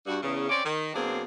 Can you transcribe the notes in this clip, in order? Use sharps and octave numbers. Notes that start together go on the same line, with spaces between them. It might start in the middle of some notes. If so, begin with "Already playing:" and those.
G2 F#4
E2 C#3
C4 C#4 D5
D#3
B2 F#3 A#3 C4 D4 G#4